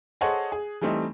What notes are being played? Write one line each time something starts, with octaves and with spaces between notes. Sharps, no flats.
G#4 A4 C5 C#5 D#5 F#5
G#4
E3 G3 A3 C4 D#4